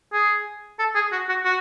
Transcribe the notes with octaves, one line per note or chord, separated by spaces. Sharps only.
G#4
A4
G#4
F#4
F#4
F#4